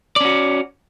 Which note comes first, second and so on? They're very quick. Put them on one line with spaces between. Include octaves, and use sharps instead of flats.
D5 C#4 F#4